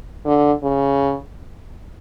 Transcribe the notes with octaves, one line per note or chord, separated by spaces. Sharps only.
D3
C#3